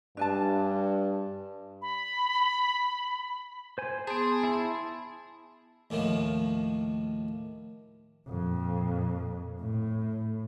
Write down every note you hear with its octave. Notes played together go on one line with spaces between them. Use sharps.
G2 D4 G#5 A5
B5
C5 G#5
B3 G#4 A5 C6
E4 A5
D#2 A2 D#3 F3
F2 A#2
A2